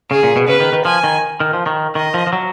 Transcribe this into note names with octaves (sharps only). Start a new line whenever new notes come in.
C#3 G#4
A#2
B2
C#3 B4
D#3
D#3
F3 G#5
D#3
D#3
F3
D#3
D#3 D#5
F3
F3
F#3